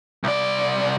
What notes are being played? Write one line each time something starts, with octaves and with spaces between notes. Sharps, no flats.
C2 D5